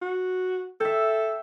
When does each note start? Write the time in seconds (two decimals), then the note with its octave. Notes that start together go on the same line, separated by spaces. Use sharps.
0.02 F#4
0.80 A4 E5 G5